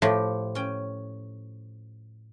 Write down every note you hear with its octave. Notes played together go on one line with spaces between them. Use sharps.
A2 F3 G4
C#4 G5